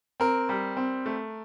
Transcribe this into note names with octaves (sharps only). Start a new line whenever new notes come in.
C4 A#4
G3
C4
A3